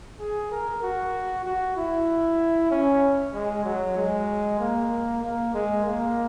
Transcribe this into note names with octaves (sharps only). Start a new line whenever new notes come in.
G#4
A#4
F#4
F#4
E4
C#4
G#3
F#3
G#3
A#3
A#3
G#3
A#3